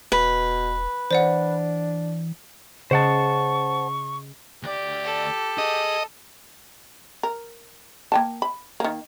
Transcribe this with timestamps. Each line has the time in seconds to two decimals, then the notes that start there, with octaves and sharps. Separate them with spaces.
0.12 E1 B2 B4
1.11 E3 D4 C5 D5 F#5
2.91 C#3 C5 D#5 F#5 A5 C#6
4.63 D2 G4 D5
5.04 A4
5.58 G#4 D#5
7.23 A#4
8.12 A#3 G5 A5
8.42 B5
8.80 D#3 A#3